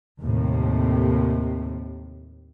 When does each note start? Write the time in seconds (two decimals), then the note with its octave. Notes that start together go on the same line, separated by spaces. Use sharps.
0.20 D#2 A2 C3